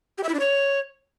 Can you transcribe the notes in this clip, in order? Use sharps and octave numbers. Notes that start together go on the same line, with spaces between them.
G4
E5
E4
D4
C#5